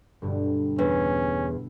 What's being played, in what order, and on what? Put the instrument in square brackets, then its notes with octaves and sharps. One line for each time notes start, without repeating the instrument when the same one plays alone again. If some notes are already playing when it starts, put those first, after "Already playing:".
[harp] G1 G2 B2
[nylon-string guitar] E2 [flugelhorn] C#4